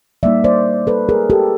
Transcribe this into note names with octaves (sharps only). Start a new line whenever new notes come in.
G3 A#3 D#4 D5 E5
C5 D5
A4 B4
G#4 A#4
G4 A4